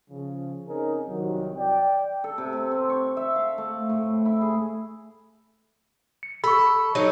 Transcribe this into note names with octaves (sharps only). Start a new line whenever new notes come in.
C#3 F3
C4 C#4 D#4 G#4 A#4
C2 D#3 F#3
D5 G5
A4
C3
C3
C4
C#6
E5
F5
A3
A2
E4
G#4
C#7
A4 B5 C#6
F#3 D#4 C#5